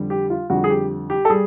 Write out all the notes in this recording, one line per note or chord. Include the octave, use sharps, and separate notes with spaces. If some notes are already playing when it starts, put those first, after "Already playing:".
Already playing: F2 D3 G3
G4
F4
F2 D3 G3 F#4
G#4
G4
G4
A4
G3 G#4